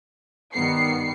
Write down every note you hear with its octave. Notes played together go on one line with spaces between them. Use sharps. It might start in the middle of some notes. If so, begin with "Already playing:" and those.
G2 D#3 G3 B3 C7 C#7